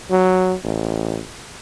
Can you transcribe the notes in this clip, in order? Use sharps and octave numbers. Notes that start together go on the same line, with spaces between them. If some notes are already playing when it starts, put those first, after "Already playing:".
F#3
A1